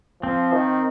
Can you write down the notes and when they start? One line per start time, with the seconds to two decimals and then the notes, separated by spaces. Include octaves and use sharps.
0.23 F3 C4
0.52 D#3